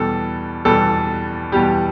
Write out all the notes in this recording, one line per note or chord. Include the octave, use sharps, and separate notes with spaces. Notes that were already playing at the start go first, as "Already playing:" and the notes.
Already playing: E2 B2 G3 A4
E2 B2 G3 A4
E2 B2 G3 G4